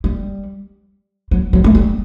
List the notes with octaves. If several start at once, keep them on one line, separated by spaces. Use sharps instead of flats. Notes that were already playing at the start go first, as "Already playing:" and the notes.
G3
F#3
F#3
A3
G3